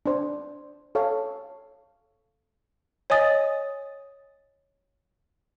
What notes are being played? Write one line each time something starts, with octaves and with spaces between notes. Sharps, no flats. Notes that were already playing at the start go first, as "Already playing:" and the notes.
D4 C5
A4 C#5 F5
C#5 D#5 G#5 D#6 A6